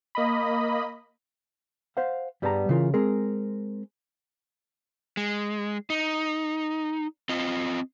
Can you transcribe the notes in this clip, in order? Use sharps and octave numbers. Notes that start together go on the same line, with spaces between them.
A#3 D#5 B5
C5 F5 F#5
G2 G3 B3 G#4 A5 A#5
C#3 E3 F4 A#4
G#3 C4 G#4 A#4
G#3
D#4
C4 F4 D#5